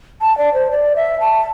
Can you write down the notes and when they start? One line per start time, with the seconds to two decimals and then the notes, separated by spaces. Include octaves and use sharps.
0.21 A5
0.38 D5
0.54 C5
0.71 D5
0.96 E5
1.20 A5